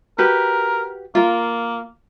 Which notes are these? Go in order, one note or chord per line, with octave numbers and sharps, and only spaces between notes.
F#4 G4 A#4 B4
A#3 F4 A#4